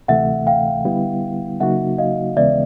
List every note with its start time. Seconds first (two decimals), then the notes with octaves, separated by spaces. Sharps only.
0.08 D2 C3 E3 A3 E5 F#5
0.47 F5 G5
0.85 D3 G3 B3 E4
1.60 C#3 F#3 A#3 D#4 F#4 E5 F#5
1.98 D#5 F5
2.37 D#2 C#3 E3 G#3 B3 D5 E5